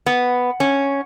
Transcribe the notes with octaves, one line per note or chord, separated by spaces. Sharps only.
B3
C#4